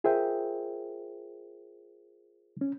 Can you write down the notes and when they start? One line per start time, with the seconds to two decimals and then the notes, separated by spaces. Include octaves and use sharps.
0.04 F4 G#4 A#4 C5 E5 G5
2.61 C#4